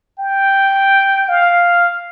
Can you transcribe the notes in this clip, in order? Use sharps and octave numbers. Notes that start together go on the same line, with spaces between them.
G5
F5